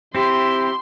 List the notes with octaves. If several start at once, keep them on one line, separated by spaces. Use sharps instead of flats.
C4 E4 G4 C6